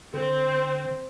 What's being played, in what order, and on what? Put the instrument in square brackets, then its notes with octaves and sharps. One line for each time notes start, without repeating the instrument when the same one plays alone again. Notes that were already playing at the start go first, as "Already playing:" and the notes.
[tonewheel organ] D3 [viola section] C4